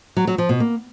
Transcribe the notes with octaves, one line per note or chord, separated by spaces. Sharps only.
F#3
F#3
F3
B2
A#3